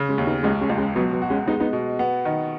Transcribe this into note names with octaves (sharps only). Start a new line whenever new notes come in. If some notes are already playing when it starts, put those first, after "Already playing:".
Already playing: C#3
G#3 C#4
D#2
B3 D#4
C#2 G#3 C#4
G#3 C#4
C#2
G#3 C#4
B2 F#3 B3
F#3 B3
F#4
G#3 C#4
G#3 B3 D#4
B3 D#4
B2
B3
D#3